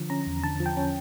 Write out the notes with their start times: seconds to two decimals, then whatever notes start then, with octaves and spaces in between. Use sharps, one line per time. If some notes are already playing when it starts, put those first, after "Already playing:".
Already playing: D3 F3
0.10 C#4 A#5
0.27 E2
0.44 D3 A5
0.60 F3
0.66 G5
0.77 C#4